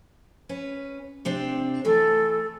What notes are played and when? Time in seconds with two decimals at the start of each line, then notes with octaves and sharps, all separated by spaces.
0.49 C#4 B4
1.25 C3 C4 D4
1.85 E3 A3 A4